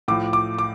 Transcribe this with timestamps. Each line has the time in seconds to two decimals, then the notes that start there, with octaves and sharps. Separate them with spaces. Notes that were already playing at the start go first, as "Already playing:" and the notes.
0.08 A2 F3 D6
0.33 D6
0.59 D6